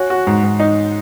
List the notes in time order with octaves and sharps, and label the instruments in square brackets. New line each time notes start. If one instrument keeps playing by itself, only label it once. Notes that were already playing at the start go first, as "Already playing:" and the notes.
Already playing: [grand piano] F#4 [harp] C#5 F#5 G#5
[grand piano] F#4
G#2
G#2
D#4